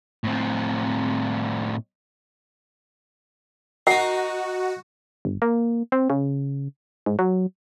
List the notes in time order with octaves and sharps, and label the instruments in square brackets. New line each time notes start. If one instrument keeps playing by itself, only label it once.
[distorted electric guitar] A2 C4
[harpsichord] D#4 A#4 [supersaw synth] F#4 [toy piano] F#5
[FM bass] G1
A#3
C4
C#3
G#2
F#3